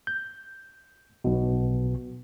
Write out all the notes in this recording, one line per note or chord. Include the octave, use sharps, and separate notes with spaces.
G6
B1 B2